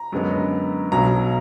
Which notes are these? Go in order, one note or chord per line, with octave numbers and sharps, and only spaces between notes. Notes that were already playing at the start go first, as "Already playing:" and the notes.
Already playing: A#5
F#2 D3 G#3 B3
B1 B2 F#3 A#5